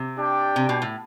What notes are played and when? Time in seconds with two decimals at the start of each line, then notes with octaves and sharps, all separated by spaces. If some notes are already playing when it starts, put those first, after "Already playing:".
Already playing: C3
0.18 D4 G4 D5 G5
0.56 C3
0.69 B2
0.82 A2